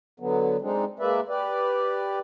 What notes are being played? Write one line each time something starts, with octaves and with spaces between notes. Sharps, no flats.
D3 F#3 B3
G#3 C4 D4 D#4
G#3 A#3 B4 D5 E5
G4 B4 D5